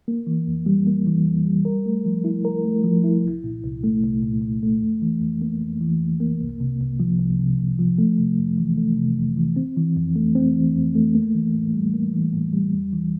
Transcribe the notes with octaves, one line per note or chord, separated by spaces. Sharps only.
A#3
E3
F2
G3
A#3
E3
F2
G3
A#4
A3
F3
E4
A#4
A3
F3
E4
C2
A#2
C2
A3
C2
A#2
C2
A3
F2
E3
F2
A#3
F2
E3
F2
A#3
C2
C3
C2
F3
C2
C3
C2
F3
A3
C3
F2
E3
A3
C3
F2
E3
C4
E3
F2
A3
C4
E3
F2
A3
A#3
E3
A2
G3
A#3
E3
A2
G3
E2
E3